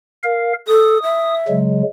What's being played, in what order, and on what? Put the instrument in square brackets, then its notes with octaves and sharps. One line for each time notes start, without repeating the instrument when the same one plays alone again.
[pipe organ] A#4 F5
[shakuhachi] A4 [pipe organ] D#6
[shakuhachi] E5
[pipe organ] C#3 F#3 G#3